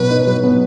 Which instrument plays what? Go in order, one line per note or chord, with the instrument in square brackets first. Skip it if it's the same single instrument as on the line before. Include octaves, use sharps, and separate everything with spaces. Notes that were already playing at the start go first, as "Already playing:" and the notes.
Already playing: [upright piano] B2 F#3 B3 [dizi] B4
[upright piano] D#4
F#3
B3